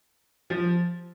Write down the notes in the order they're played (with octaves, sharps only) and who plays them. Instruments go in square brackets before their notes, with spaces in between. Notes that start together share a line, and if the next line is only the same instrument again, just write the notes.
[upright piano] F3